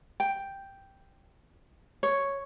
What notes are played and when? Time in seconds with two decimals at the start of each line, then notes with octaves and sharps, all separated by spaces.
0.20 G5
2.03 C#5